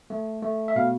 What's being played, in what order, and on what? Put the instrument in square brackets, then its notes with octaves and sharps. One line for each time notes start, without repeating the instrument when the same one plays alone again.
[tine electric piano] A3
A3
E5
B2 F5